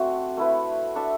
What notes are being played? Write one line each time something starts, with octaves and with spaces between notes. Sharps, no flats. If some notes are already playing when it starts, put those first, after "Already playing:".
Already playing: A3 C4 D4 F#4
A3 E4 B4
D4 A4 E5